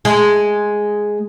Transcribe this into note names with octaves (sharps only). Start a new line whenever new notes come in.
G#3